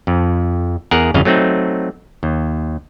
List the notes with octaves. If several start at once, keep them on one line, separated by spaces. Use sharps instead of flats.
F2
E2 G#4 A#4 F#5
G1 F2 C#3 D#5 F5
F#3 A3 C4 D#4
D#2